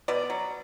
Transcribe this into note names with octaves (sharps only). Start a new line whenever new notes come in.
B2 D5
F#3